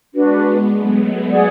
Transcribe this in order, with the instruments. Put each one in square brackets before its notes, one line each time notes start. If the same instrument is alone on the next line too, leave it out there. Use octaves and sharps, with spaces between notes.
[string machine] G#3 B3 [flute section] D4 F#4 B4
[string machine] F#3 A3
[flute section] G#4 D5 F#5